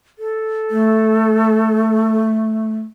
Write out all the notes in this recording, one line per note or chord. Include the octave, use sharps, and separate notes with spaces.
A4
A3